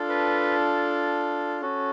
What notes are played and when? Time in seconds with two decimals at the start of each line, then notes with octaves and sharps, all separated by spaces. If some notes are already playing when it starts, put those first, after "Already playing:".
Already playing: D4 F4 A4
0.09 B4
1.61 C#4 F#4 A4